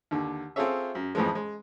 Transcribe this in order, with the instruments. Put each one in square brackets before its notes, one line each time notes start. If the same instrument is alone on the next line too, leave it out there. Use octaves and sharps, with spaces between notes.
[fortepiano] D#2 D3
C4 F4 G#4 A4 C#5 E5
F#2
F2 A2 E3 F3 G#3
G#3